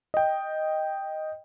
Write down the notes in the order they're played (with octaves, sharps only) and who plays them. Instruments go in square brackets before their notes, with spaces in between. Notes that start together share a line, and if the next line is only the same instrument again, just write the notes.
[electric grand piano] D#5 G5